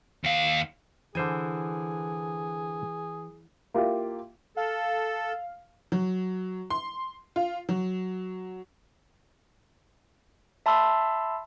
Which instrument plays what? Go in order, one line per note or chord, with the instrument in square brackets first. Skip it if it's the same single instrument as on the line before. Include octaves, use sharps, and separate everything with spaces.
[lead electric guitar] D#2 F5
[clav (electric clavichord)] D3 C5 G#5 [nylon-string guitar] E3 [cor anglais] G#4
[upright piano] A#3 E4 F4 G4
[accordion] A4 [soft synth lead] F5
[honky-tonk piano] F#3
C6
F4
F#3
[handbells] E5 A5 B5 C6 E6